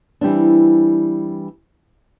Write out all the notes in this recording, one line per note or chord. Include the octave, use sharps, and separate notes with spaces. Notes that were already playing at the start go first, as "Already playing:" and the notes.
E3 G3 C4 D4